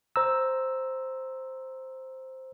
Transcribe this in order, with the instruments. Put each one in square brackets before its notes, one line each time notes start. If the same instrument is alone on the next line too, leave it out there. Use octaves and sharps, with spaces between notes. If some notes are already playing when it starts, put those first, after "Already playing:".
[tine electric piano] C5 A#5 E6